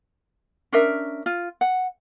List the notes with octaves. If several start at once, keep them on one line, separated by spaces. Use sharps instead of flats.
C#4 D4 A#4 E5
F4
F#5